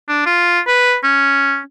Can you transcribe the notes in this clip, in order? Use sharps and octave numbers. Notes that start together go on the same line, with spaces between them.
D4
F4
B4
C#4